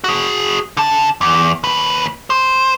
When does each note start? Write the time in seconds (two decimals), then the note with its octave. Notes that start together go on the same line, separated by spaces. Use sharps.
0.04 F#4 G#4
0.77 D3 A5
1.21 E2
1.64 D#2 B4
2.30 C5